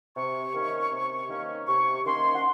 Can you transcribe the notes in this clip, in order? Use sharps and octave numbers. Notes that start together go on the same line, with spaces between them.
C3 C#6
D#3 A#3 C#4
C3
D#3 A#3 C#4
C3 C#6
D#3 A#3 C#4 C6
F#5